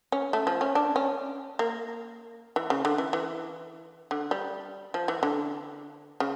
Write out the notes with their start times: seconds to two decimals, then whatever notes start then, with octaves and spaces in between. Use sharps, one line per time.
0.12 C#4
0.33 A3
0.47 F3
0.61 C#4
0.75 D4
0.96 C#4
1.59 A#3
2.56 E3
2.70 C#3
2.85 D3
2.98 E3
3.13 E3
4.11 D3
4.31 G3
4.94 F3
5.08 E3
5.23 D3
6.20 C#3